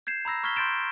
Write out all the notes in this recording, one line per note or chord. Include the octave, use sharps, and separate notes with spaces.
G6 G#6 C7 E7
A#5 B5 E6 A#6
C#6 F6 G#6 B6 G7
C6 G6 A6 D7 E7